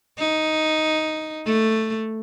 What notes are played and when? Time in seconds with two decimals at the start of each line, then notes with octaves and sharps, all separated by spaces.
0.19 D#4
1.46 A3